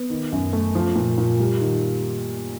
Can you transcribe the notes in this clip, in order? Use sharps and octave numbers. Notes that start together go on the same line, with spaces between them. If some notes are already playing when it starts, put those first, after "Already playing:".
Already playing: B3
D#3
F#2
A3
F3
A#2
A#2
G3
D#3